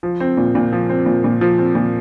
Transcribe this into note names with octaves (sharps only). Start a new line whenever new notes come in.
F3
C4
A#2
A#2
F3
C4
A#2
A#2
F3
C4
A#2